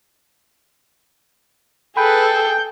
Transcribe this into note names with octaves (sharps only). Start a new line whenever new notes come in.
G#4 A4 B4 G5
G6